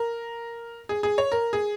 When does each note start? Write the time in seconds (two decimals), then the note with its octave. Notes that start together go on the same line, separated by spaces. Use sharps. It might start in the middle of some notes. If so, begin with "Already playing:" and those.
Already playing: A#4
0.89 G#4
1.03 G#4
1.18 C#5
1.32 A#4
1.53 G#4